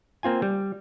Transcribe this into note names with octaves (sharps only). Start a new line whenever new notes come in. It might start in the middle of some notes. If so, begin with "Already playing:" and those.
A#3 C4 F4 G#5
G3